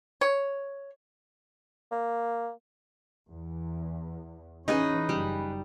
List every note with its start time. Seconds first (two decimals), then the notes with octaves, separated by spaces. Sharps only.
0.21 C#5
1.91 A#3
3.31 E2
4.68 E3 C#4 D#4 G#4 B4 D#5
5.09 F#1 G3